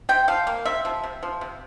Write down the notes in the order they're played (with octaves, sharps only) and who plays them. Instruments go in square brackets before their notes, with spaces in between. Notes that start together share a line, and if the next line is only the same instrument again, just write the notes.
[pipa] C3 G5
F3 F5
A#3
C3 E5
F3
C3
F3
C3